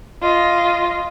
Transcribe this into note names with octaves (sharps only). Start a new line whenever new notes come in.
F4 D#5